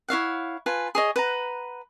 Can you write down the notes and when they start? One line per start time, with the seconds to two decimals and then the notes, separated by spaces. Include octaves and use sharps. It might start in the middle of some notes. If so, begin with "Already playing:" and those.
0.08 E4 C#5 F5 F#5
0.66 F4 B4 G#5 A5
0.95 G#4 C#5 D#5
1.16 B4 F#5 A#5